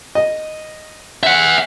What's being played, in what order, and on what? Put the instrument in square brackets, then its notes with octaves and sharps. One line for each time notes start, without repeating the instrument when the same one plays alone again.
[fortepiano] D#5
[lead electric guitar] E5 F#5